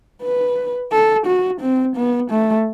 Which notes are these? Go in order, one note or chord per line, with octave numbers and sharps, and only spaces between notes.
B4
A4
F#4
C4
B3
A3